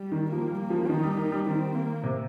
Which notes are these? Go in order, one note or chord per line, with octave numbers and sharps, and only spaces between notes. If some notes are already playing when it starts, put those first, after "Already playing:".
Already playing: G3
D#3
F3 A#3
G3
A#3
F3
F3
D#3 D#4
G3
A#3
G3
D#3 C4
A#3
C3